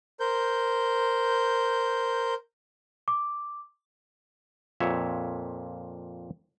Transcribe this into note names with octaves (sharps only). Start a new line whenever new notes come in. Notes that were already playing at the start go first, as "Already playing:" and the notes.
A#4 C5 G6
D6
F2 A#2 C#5 E5